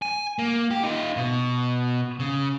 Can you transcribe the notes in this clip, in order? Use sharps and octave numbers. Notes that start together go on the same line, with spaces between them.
G#5
A#3
G4
D#4 F4
B2
C#3